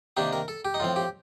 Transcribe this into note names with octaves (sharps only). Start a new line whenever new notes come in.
C3 D#3 A#3 D4 G4
A#4
A4
G4
D#4
A2 F3 C4 F4
G4